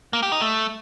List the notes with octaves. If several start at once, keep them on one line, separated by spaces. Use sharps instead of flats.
A#3
G4
D#4
A3